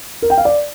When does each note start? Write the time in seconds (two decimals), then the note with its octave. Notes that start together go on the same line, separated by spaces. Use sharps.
0.22 A#4
0.30 G5
0.38 F5
0.45 D5